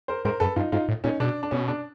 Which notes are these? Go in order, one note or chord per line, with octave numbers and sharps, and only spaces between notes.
A#4 C5
G#2 A#4 C5
F#2 A4 B4
G2 D#4 F4
G#2 D#4 F4
A2
A#2 C#4 D#4
B2 D4
D4
B2 C#4
D4